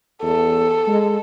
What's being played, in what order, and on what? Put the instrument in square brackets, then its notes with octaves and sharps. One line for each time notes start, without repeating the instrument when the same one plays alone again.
[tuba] E2 [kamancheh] A4
[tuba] G#3